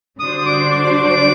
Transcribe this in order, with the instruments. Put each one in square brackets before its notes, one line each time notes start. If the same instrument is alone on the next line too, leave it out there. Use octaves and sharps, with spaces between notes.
[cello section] D3 G3 D4 F#4 C5 [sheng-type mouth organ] D#6
[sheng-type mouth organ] D#6
D6
D6